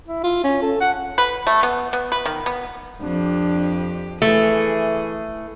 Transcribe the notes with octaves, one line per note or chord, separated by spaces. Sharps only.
E4
F4
C#4
A4
F#5
B4
A3
B3
B3
B4
D#3
B3
F2 D4 G4
E3 A3 G#4